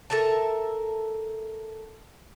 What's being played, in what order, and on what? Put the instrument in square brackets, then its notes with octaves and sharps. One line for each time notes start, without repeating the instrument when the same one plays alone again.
[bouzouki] A4 A#4 E5 A5